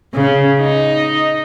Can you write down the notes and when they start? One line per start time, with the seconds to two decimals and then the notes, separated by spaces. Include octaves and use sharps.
0.15 C#3
0.60 D#4